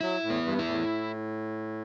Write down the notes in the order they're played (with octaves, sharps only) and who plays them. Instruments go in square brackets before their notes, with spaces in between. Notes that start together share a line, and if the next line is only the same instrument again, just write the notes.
[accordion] F#3 [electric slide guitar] E4
[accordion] A2
[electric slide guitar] B3
[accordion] G2
[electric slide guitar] E4
[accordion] A2